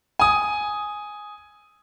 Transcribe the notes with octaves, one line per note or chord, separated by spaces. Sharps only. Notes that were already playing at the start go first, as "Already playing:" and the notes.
G#5 D#6